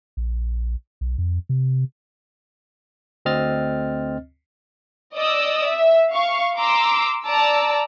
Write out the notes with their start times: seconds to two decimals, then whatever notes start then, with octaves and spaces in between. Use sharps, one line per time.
0.17 A#1
1.01 B1
1.18 F2
1.49 C3
3.25 D2 C4 D#5 F6 A6
5.15 D5 D#5 D#6 E6
5.68 E5
6.12 F5 C#6
6.58 A#5 C6 D6 E6
7.25 D5 A5 A#5 D6 E6